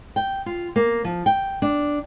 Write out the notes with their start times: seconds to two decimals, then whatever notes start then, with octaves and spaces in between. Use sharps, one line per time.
0.16 G5
0.46 F4
0.76 A#3
1.05 F3
1.26 G5
1.62 D4